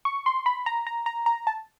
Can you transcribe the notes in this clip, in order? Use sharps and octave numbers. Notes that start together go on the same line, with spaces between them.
C#6
C6
B5
A#5
A#5
A#5
A#5
A5